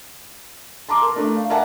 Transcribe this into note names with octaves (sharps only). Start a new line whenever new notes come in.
A5 A#5 C6 D6
A#4
A3 D4
F5
A#4 D5 E5 F#5 G#5 A5